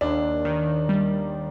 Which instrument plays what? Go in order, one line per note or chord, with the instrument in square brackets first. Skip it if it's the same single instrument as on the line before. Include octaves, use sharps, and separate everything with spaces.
[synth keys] D#2 [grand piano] D4
[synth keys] D#3
G3